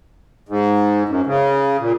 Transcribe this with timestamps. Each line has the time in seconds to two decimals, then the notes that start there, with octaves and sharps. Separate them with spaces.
0.49 G#2
1.09 F#2
1.26 C#3
1.80 A#2